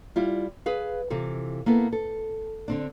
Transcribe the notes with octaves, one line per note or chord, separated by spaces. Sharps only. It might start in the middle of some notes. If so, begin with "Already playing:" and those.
G3 E4 F4
G#4 B4 F5
C3 E3 F4 A4
A#3 B3 E4 A4
A4
D3 C4 D4